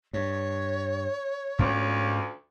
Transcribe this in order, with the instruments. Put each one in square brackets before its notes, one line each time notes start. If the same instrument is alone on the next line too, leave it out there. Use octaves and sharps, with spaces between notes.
[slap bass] G2 [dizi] C#5
[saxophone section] D2 F3 [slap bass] G#2 C#4